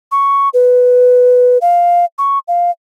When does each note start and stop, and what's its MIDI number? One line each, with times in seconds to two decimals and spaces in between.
0.12 0.49 85
0.54 1.58 71
1.61 2.05 77
2.18 2.39 85
2.48 2.71 77